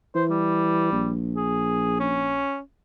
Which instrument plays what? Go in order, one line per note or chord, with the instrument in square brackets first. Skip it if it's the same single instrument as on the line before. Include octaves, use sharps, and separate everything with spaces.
[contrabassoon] E3 [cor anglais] C5
[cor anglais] G3
[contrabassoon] A#1
[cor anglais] G#4
C#4